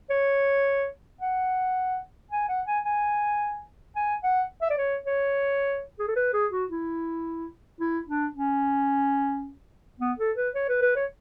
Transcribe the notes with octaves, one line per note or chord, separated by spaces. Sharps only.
C#5
F#5
G#5
F#5
G#5
G#5
G#5
F#5
E5
D5
C#5
C#5
G#4
A4
B4
G#4
F#4
E4
E4
D4
C#4
B3
A4
B4
C#5
B4
B4
C#5